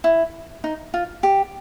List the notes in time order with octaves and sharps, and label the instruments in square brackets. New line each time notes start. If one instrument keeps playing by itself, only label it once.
[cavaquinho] E4
D#4
F4
G4